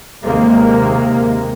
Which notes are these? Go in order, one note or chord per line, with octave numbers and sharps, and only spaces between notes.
D#2 C3 G#3 A#3